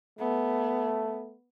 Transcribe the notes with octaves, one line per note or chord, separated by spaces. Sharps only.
A3 B3